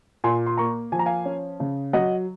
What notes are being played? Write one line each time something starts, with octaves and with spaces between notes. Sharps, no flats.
A#2 G#5 C6
C6
A#3 A#5 C#6
F3 G#5
A#5
F5 G#5
C#4
C#3
F#3 D#5 F#5